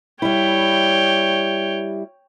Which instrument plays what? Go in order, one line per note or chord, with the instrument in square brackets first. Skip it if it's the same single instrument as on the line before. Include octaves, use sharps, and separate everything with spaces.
[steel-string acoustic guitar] G3 E4 [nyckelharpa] C#5 G5